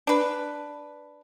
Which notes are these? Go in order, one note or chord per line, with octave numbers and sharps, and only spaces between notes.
D4 B4